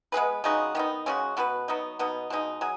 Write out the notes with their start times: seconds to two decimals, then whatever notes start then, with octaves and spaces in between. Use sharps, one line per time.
0.12 G#3 B3 G#4 B4
0.44 C#3 G#3 D#4 F#4
0.75 D#3 B3 D#4
1.06 C#3 G#3 C#4 F#4
1.37 B2 B3 F#4 B4
1.68 F#3 B3 D#4
1.99 B2 B3 D#4
2.30 B2 G#3 D#4
2.61 F#3 G#4